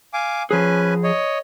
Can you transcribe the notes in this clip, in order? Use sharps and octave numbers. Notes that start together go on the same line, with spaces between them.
F5 G#5 D6
F3 C#4 G#4 B4 G#5
C#5 D#5